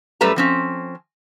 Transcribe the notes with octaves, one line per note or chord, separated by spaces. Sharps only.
F#2 G3 A3 B4 A#5
F3 C4 C#4